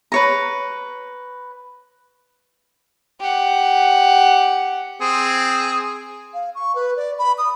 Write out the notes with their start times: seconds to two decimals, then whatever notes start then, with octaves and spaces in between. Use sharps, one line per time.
0.12 B4 C#5 A#5
3.20 G4 F#5
5.01 C4 G#4
6.34 F5
6.55 C#6
6.75 B4
6.97 D5
7.19 B5
7.38 D#6